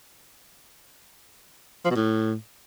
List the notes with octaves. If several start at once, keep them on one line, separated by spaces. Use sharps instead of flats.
F3
B2
A2